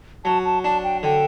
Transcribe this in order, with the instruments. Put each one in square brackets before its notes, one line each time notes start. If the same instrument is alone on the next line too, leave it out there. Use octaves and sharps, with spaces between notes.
[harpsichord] F#3 [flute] A5
[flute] A5
[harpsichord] D4 [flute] A5
[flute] G5
[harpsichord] D3 [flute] G5